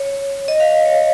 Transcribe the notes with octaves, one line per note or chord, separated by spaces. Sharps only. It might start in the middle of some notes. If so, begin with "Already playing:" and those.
Already playing: C#5
D#5
F5
C#5